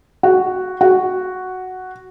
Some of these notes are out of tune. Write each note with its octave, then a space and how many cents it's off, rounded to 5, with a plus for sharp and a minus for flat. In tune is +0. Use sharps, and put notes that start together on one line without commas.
F#4 +0
F#4 +0